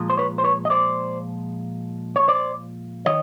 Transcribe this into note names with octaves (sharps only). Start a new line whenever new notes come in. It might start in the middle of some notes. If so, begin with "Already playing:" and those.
Already playing: A#2 F3 G#3
C5
B4 C#5
C5
B4 C#5
D#5
C5 D5
C#5
C5 D5
D#3 C#5 D#5